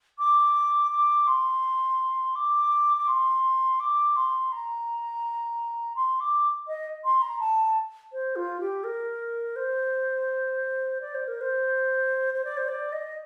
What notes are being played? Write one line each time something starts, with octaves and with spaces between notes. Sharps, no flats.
D6
D6
C6
D6
D6
C6
D6
C6
A#5
C6
D6
D#5
C6
A#5
A5
C5
F4
G4
A#4
C5
D5
C5
A#4
C5
C5
D5
C5
D5
D#5